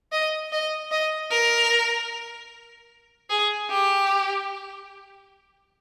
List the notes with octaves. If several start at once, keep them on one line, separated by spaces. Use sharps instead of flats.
D#5
D#5
D#5
A#4
G#4
G4